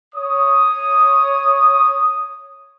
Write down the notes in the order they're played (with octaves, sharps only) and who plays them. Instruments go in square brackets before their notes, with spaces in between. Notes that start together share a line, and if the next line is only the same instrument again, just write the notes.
[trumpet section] C#5 D#6